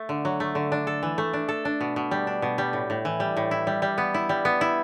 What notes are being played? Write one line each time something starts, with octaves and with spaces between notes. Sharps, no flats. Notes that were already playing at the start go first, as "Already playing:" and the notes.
Already playing: A3
D3
F#3
A3
D3
D4
A4
E3
A3
D4
A4
D4
B2
B2
G3
D4
B2
G3
A2
A2
E3
G3
A2
E4
G3
G3
B3
E4
G3
B3
E4